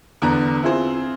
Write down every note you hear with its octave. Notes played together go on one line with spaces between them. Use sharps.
E2 D3 B3 D4 A5 A#5
C4 E4 F4 G#4 C5